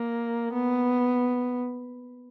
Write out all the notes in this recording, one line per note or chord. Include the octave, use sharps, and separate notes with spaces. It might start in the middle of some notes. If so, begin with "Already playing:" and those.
Already playing: A#3
B3